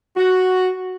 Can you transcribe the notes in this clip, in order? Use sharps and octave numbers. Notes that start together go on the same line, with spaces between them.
F#4